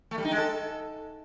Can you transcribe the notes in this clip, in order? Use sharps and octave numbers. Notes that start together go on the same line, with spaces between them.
A3
G3
D#4
G#3
A4